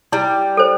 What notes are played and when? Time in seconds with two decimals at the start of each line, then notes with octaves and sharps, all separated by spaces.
0.12 G3 E4
0.57 A4 C5